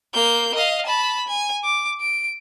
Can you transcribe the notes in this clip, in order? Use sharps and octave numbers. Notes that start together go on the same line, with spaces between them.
A#3 G6
D#5 F5
A5 B5
G#5
D6
D7